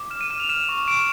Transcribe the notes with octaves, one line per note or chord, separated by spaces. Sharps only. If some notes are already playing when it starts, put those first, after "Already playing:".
Already playing: D6
F6 E7
D#7
F6 E7
F7
F6 E7
C#6
C#6 D7